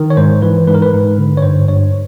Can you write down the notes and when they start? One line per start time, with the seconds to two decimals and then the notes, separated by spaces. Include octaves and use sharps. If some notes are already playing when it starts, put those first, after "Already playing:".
Already playing: D#3
0.10 C#5
0.17 G#2 C5
0.42 E3 B4
0.67 G#2 B4
0.74 A#4
0.82 B4
0.93 G#2
1.18 D3
1.37 C#5
1.42 G2 C5
1.68 G2 C#5